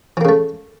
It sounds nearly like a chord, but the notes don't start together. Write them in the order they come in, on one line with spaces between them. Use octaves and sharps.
E3 A#3 C#3 A3